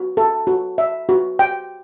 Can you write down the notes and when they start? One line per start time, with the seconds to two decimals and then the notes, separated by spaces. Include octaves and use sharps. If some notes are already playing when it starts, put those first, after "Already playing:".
Already playing: F#4
0.17 A4
0.47 F#4
0.78 E5
1.09 F#4
1.39 G5